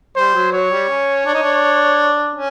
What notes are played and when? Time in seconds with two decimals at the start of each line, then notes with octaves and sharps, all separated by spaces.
0.16 G3 C5
0.35 F#3
0.53 F#3 C#5
0.71 G3
0.89 C#4
1.25 D4
1.33 D#4
1.42 D4
2.35 C#4